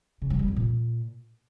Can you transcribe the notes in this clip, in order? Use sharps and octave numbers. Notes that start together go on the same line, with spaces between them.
C#3
F#3
G3
F2
A#2